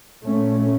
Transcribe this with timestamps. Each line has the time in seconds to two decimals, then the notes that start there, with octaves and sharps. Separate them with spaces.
0.23 A#2 A3 C#4